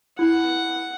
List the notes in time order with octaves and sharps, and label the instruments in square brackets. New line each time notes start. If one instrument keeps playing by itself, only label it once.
[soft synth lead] E4 [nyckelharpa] F#5